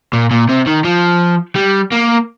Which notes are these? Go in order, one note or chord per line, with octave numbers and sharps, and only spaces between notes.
A#2
A#2
C3
D#3
F3
G3
A#3